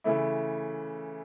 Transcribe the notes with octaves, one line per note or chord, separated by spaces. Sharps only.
C#3 E3 A3 E4